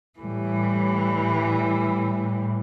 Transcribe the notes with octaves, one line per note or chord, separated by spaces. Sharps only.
A2 E3 G3